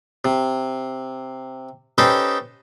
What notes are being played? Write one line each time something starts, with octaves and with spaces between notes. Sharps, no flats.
C3
C#4 D#4 G4 A4 B4 C5